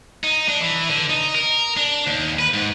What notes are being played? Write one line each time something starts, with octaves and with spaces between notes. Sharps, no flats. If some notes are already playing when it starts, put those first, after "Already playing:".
D#4
D4
E3
D3
D#4
A#4
D4
D#2
B4
G#2